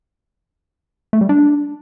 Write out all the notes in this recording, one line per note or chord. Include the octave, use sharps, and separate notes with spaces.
A3
G3
D4